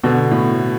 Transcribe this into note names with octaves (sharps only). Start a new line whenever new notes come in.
B2 D3
A2